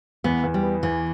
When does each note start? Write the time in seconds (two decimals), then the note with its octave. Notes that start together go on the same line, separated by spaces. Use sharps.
0.24 E2 B3
0.44 E2
0.54 G3
0.63 B3
0.83 E2 E3